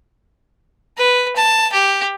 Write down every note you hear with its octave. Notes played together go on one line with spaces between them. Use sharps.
B4
A5
G4